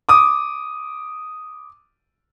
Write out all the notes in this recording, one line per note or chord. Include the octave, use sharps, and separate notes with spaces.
D6 D#6